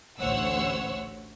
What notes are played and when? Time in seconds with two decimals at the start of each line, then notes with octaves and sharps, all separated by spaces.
0.20 A1 D2 C5 C#5 F#5 E6